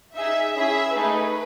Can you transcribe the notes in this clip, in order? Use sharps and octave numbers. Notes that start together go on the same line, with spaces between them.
D#4 G#4 E5
C#4 E4 G#4 E5
A3 D#4 G#4 B4